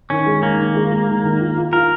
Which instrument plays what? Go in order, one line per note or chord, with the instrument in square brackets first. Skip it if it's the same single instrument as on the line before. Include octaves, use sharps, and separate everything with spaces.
[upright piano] D#3 [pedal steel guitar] C#4
[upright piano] G#3
[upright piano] D#3 [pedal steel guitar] A#3
[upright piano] D#3
G#3
G#3
D#3
D#3
F4
F4
[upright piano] F4 [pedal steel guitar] A#4